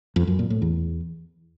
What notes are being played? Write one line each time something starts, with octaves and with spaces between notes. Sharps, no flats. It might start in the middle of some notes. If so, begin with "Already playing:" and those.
F2
F#2
A#2
A2
E2